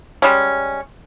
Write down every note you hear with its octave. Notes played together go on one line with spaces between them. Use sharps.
G3 G#3 C#4